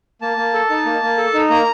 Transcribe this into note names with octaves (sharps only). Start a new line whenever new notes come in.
A#3 A5
A#3
A4
D#4
A#3
A#3
A4
D#4
A#3 A#5